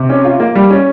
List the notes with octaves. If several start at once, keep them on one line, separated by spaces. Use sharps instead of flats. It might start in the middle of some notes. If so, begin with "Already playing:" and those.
Already playing: C3
C#4
F4
A#3
G3
C#4